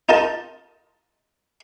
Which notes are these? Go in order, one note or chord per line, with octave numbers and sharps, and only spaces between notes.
D#4 F4 A#4 D#5 A5